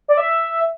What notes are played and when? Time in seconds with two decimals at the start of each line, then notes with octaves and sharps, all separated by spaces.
0.08 D5
0.18 E5